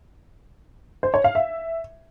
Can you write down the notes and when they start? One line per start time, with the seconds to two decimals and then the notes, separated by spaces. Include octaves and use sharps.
1.03 C5
1.14 C#5
1.24 F5
1.35 E5